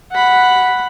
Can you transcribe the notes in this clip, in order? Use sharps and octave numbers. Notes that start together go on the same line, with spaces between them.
F#5 B5